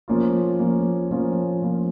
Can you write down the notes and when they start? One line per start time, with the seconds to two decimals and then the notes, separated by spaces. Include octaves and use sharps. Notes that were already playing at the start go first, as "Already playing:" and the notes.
0.08 F3 A#3 C#4 F4
0.59 F3 A#3 C#4 F4
1.11 F3 A#3 C#4 F4
1.62 F3 A#3 C#4 F4